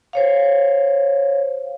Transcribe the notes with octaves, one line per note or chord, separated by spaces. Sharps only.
C5 C#5 F5